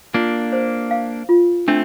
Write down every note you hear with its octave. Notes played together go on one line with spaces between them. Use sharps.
A#3 D4 F4
C5
F5
F4
A3 C4 D4